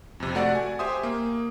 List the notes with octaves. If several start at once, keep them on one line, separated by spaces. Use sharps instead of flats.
F2 C3
A3 F#4 D5 F#5
G#5
G4 C5 E5 G#5 C6 D#6
A#3